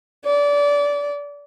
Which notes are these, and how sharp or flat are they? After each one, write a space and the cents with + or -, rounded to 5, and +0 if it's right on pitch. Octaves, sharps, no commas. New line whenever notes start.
D5 -25